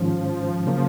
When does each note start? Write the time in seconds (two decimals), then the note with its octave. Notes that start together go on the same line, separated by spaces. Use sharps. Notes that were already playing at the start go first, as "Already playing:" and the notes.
Already playing: G#2 D#3 F3 G#3 C#4
0.67 C#3 F#3 A#3